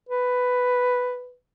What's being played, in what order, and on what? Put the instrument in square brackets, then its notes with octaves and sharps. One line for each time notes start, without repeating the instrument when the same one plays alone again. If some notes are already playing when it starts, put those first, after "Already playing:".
[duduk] B4